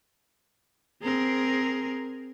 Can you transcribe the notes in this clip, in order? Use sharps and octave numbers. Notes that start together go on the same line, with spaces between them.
C4 G#4 A#4